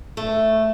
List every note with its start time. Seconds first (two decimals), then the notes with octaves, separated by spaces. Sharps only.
0.17 A3